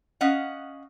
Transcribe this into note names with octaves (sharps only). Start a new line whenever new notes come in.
C#4 D#5 F5 F#5